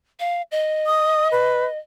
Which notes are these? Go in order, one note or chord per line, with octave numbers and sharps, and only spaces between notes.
F5
D#5
D#6
B4